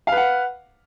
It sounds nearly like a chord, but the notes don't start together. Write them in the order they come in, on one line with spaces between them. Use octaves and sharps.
F5 B4 F#5